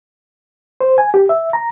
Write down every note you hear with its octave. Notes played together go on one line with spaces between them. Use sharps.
C5
G#5
G4
E5
A#5